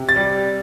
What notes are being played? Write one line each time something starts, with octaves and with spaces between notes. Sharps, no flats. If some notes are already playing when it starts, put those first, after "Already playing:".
Already playing: C3
A6
G3